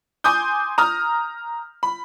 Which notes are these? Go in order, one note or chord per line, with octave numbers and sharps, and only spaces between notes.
G#5 C6 D6 D#6 G6
A#5 D#6 F6
B5